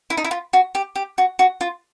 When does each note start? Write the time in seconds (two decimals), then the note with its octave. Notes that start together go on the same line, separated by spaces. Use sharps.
0.10 E4
0.17 D#4
0.24 E4
0.31 F4
0.53 F#4
0.75 G4
0.96 G4
1.18 F#4
1.39 F#4
1.61 F4